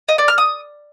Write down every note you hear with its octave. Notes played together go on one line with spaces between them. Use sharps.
D#5
D5
F6
D#6